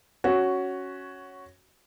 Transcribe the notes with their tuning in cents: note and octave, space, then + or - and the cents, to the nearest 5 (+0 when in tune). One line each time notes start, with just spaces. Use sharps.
C#4 +0 F#4 +5